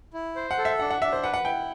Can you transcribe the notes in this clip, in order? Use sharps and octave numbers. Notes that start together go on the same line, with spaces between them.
E4
C5
F#5
A4
E5
D4 F#5
F#5
D4 E5
C5
B4 F#5
F#5
E4 G5